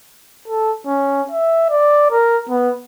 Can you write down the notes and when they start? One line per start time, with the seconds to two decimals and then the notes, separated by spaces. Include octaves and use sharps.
0.48 A4
0.87 C#4
1.31 E5
1.69 D5
2.11 A#4
2.49 B3